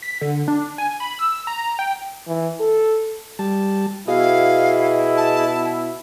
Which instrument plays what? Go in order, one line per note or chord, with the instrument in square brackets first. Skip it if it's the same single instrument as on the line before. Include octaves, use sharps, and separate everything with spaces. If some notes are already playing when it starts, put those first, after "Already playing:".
[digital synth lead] B6
D3
D4
G#5
B5
E6
A#5
G5
[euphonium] E3
A4
[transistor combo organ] G3 A5
[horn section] B2 B3 E4 [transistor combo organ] F#4 G#4 D#5 [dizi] F5
[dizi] A5